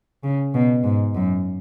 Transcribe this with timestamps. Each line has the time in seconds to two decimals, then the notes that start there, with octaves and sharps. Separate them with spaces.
0.24 C#3
0.54 B2
0.84 G#2
1.15 F#2